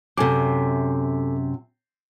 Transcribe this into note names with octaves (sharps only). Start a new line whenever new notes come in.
F#2 C3 A4 G#5 D6